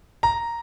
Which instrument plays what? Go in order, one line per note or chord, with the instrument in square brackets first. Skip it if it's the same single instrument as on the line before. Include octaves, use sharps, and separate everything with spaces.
[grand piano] A#5